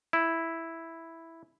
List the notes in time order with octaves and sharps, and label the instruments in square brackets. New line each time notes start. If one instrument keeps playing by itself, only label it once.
[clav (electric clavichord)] E4